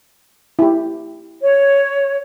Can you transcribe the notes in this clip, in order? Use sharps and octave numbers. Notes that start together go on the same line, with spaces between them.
E4 G4
C#5